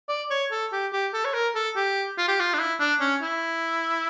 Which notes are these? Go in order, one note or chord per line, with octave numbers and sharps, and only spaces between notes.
D5
C#5
A4
G4
G4
A4
C#5
A#4
A4
G4
F4
G4
F4
D4
E4
D4
C#4
E4